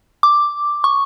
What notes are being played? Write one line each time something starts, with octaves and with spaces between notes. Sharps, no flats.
D6
C#6